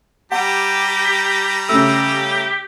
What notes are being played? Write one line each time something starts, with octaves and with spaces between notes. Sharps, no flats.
G3 G4 F#5 A#5
C#3 A3 G4 E6